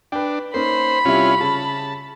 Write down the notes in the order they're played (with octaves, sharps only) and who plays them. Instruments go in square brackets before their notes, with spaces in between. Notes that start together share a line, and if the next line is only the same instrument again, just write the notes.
[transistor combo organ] D4 [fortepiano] B4 G5
[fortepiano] A#3 C#4 D#4 [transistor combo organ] C5 [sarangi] B5
[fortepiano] C3 G3 E4 [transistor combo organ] C#4 F4
[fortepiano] C#3 [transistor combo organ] A5